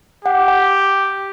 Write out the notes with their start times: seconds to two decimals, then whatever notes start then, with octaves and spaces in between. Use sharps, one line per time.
0.24 G4 F#5
0.48 G5